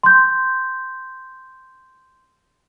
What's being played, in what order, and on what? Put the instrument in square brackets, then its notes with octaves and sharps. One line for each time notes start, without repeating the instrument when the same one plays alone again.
[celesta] C6 G6